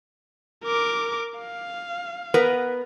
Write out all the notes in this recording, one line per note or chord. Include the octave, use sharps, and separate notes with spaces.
A#4 D6
F5
B3 A#4 B4